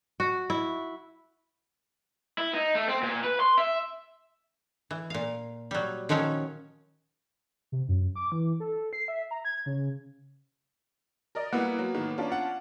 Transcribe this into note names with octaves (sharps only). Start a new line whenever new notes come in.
F#4
E4
E4
D#4
A3
C4
A#2
B4
C6
E5
E3
A#2 F5
F#3 G3
D#3 F3 F#3 C#4 C#5
C3
F#2
D6
E3
A4
C7
E5
A#5
G#6
C#3
A#4 D5 D#5
G3 A#3 B3 E4 F#5
F#3
A2 D#3
C#4 D4 F4
F#5